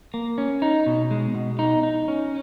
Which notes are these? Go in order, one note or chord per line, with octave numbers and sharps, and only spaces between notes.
A#3
C#4
D#4
B2
G#3
B2
D#4
D#4
C#4